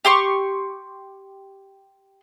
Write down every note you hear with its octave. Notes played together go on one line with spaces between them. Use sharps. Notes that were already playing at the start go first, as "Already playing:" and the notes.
G4 C6 C#6